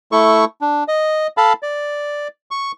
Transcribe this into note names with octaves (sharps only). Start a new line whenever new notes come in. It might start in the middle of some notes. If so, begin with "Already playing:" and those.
A3 E4 A4 C#6
D4
D#5
A4 F5 A5 B5
D5
C#6